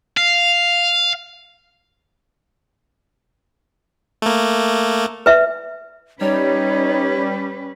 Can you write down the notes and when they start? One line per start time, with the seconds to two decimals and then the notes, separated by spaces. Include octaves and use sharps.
0.17 F5
4.22 A3 A#3
5.26 B4 E5
6.21 G3 C#4 D#4 B4 C#5